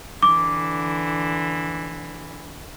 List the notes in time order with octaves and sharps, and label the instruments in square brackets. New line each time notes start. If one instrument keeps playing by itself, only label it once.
[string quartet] D3 E3 [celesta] D6